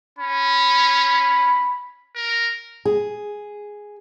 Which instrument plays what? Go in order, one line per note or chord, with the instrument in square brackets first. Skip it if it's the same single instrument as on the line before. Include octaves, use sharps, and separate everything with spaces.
[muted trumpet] C#4 [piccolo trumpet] B5
[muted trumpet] A#4
[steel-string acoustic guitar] G#4